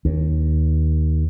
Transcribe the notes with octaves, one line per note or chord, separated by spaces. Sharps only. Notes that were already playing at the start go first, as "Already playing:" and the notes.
D#2